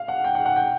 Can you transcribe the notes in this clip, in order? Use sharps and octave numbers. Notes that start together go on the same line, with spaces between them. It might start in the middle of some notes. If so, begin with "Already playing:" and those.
Already playing: F5
F#5
G5
F#5
F#5
G5